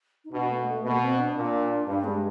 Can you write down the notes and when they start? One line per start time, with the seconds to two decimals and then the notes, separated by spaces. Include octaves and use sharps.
0.25 D#4
0.32 B2 D4
0.50 A3
0.67 A3
0.84 B2 A#3
1.02 C4
1.18 D4
1.36 A#2
1.87 G2 D4
2.04 G#3